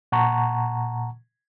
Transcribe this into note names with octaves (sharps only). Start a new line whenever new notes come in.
A#2 F#5 A5 A#5 C#6